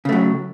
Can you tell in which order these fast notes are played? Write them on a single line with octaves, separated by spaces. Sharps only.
C#3 A3 F#3